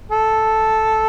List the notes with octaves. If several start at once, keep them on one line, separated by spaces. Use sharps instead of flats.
A4